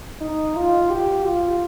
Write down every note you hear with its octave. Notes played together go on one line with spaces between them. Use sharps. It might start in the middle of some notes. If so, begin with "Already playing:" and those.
D#4
F4
G4
F4